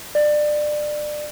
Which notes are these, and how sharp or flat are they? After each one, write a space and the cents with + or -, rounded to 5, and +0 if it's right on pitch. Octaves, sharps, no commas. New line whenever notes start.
D5 +25